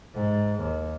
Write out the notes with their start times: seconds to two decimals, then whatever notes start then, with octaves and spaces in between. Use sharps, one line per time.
0.15 G#2
0.61 D#2